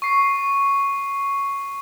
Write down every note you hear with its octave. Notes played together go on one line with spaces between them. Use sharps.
C#6 C7